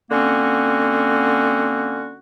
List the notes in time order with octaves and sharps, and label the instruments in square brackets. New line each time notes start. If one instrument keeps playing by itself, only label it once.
[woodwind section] D3 A#3 C4 C#4 F#4